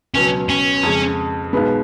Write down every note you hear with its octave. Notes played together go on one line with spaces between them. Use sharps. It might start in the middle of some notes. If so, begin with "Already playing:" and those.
C#2 B2 F#3 C#4
C#4
F2 C#3 G#3
B1 B2 G#3 B3